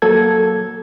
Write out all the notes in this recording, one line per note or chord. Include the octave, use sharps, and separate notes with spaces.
F#3 A#3 A4 G#6